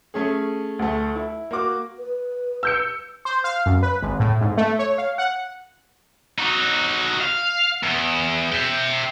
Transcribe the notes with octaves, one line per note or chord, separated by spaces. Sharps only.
A3 C#4 G#4
D2 A3
E4
A#3 F#4 D6
B4
E6 G6 C#7
C5
F5
F#2
B4
G#1
A2
G#2
A3
C#5
F5
F#5
D#4 F#4
F5
E2
E5 G5